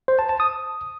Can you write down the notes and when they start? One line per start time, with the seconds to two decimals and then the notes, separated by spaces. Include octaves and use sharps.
0.08 C5
0.19 A5
0.29 A5
0.40 D#6